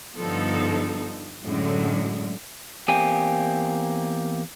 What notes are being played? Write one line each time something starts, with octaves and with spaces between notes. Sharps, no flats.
G2 D3 F3 B3 D#4 A4
F#2 A2 D3 F#3 G#3
E2 A#3 C4 G4 G#5